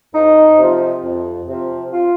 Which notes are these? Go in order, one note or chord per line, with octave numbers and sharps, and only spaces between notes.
F2 D#4
C3 F3
F2
C3 F3
F4